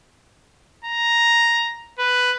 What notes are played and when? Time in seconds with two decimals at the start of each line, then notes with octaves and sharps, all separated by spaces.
0.85 A#5
1.99 B4